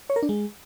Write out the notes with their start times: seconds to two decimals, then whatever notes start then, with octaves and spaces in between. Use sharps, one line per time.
0.10 C#5
0.16 A#4
0.23 D4
0.29 G#3